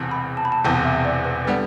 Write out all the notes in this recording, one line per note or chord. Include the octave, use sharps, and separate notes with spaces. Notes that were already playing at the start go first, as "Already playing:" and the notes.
Already playing: E1 E2 C3
B5
A5
B5
A5
E1 E2 C3 G5
E5
D5
B4
D3 G3 B3 B4